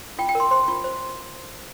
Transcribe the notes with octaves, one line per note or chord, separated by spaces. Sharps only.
F4 G5
G5
A#4 C6
C5 C6
F4
C5